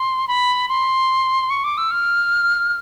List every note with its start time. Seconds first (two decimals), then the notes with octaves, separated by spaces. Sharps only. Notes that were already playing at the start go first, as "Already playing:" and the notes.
Already playing: C6
0.28 B5
0.69 C6
1.50 C#6
1.64 D6
1.78 E6
1.91 F6